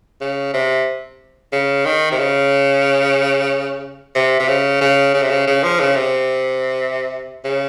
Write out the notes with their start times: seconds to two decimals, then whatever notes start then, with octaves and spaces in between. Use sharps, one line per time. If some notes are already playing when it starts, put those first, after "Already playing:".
0.21 C#3
0.54 C3
1.53 C#3
1.85 D#3
2.11 C3
2.19 C#3
4.15 C3
4.40 C3
4.48 C#3
4.81 C#3
5.14 C#3
5.22 C3
5.30 C#3
5.47 C#3
5.63 F3
5.80 C#3
5.96 C3
7.44 C#3